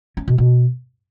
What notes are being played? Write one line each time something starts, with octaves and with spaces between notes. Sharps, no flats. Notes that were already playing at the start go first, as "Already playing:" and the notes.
C#4
B2
B2